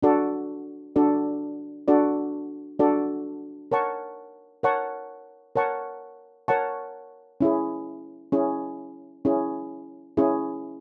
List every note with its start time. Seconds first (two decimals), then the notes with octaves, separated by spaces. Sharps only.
0.03 D4 F#4 A4 D5
0.96 D4 F#4 A4 D5
1.88 D4 F#4 A4 D5
2.79 D4 F#4 A4 D5
3.72 A#4 C#5 F#5 A5 C#6
4.63 A#4 C#5 F#5 A5 C#6
5.56 A#4 C#5 F#5 A5 C#6
6.48 A#4 C#5 F#5 A5 C#6
7.41 C#4 E4 G#4
8.32 C#4 E4 G#4
9.25 C#4 E4 G#4
10.17 C#4 E4 G#4